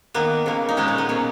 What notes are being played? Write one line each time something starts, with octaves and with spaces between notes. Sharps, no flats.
D#3 A#3 B3
C#3 F#3 A#3
D#4
A#2 G#3 B3 C#4
C#4
B3
B2 F#3 A#3 C#4